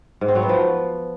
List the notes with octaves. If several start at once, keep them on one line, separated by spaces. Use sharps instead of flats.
G#2
C4
F#3
B3
F3